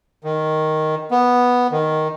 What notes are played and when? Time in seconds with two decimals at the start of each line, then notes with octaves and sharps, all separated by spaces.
0.24 D#3
1.11 B3
1.71 D#3